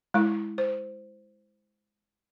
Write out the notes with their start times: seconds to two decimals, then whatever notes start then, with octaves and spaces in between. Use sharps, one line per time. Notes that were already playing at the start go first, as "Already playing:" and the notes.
0.14 G#3 E4
0.58 C5